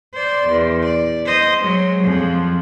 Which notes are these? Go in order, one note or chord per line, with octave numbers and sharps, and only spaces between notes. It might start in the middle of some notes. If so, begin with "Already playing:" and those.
C5 D5
E2
D5
C5 D#5
F#3 G#3
F2 F3